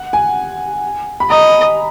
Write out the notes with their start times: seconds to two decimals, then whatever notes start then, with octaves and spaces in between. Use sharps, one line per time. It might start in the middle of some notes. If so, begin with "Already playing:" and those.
Already playing: F#5
0.13 G#5
1.20 B5
1.30 D#5 A#5